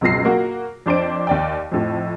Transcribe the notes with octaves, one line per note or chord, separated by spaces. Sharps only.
C#2 F#2 B2 F4 A#6 C7
A#3 F#4
F2 D4 C5 D5 D7
D#2 D5 G5
F2 A2 F3